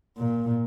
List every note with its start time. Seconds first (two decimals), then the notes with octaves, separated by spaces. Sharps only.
0.17 A#2